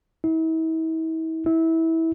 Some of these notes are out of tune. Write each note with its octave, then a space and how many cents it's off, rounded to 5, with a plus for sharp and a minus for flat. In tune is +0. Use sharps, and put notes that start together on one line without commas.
E4 -40
E4 -20